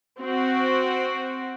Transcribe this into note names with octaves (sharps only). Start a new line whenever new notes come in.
C4 F#4